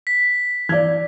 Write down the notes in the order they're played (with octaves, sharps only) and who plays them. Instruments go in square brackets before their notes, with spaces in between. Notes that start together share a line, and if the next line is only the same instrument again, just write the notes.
[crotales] B6
[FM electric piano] E3 [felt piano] D5 G#6